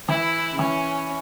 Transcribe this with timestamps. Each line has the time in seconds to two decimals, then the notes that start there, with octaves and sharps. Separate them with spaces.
0.09 E3 E4
0.52 C#3
0.59 E3 C#4